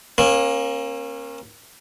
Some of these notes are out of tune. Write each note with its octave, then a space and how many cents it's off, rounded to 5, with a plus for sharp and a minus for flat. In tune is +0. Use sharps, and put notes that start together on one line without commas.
A#3 +15 C#4 -35